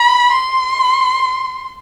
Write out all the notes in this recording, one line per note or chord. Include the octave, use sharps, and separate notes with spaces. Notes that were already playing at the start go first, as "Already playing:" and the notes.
Already playing: B5
C6